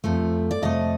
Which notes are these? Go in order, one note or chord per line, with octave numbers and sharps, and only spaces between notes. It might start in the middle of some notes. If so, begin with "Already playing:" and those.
F2 C3 F3 A3
D5
F2 C3 F3 A3 D#5